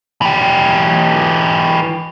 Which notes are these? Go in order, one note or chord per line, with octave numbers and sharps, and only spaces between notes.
E3 G4